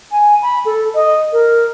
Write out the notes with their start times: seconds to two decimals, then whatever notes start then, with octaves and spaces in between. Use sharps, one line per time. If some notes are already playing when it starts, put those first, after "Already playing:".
0.11 G#5
0.42 B5
0.65 A4
0.95 D#5
1.33 A#4